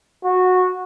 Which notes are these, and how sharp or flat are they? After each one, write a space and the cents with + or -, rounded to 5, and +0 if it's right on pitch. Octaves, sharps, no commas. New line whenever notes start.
F#4 -15